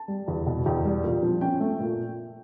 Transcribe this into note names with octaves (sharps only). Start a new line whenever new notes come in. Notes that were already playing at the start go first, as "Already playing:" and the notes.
Already playing: A5
G3
E2
B2
E2 G5
G3
A#2
F3
C#4 G5
A3
A#2